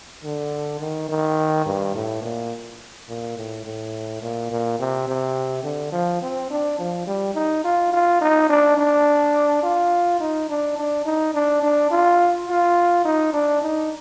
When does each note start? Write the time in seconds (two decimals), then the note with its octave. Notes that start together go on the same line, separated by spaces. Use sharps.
0.24 D3
0.80 D#3
1.09 D#3
1.66 G2
1.95 A2
2.22 A#2
3.09 A#2
3.37 A2
3.65 A2
4.22 A#2
4.51 A#2
4.79 C3
5.08 C3
5.64 D3
5.93 F3
6.22 C4
6.50 D4
6.79 F3
7.07 G3
7.35 D#4
7.65 F4
7.93 F4
8.21 D#4
8.49 D4
8.77 D4
9.63 F4
10.21 D#4
10.49 D4
10.78 D4
11.06 D#4
11.34 D4
11.63 D4
11.91 F4
12.48 F4
13.05 D#4
13.33 D4
13.62 D#4